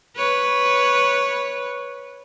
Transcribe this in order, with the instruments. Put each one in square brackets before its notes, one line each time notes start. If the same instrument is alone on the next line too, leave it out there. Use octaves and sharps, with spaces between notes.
[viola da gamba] B4 C#5